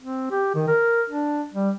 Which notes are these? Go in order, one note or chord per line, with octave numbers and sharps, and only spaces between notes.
C4
G4
D#3
A#4
D4
G3